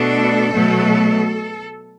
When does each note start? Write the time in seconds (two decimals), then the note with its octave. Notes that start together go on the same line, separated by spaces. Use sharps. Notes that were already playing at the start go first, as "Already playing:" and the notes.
Already playing: B2 A3 D4 A4
0.53 B2 F#3 A3